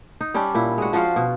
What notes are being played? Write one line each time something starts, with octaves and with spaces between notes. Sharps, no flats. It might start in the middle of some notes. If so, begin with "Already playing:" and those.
D#4
G3 C#4 D4
A#2 E4
G#3 F#4
F3 F4 F#4 F5
B2